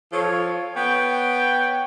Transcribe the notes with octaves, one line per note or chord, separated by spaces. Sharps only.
F3 A4 C#5
B3 C#5 G5